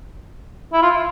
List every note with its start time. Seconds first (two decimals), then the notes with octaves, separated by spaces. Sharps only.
0.73 E4
0.82 F4